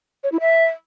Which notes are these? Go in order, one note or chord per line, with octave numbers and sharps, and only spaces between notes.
C#5
E4
E5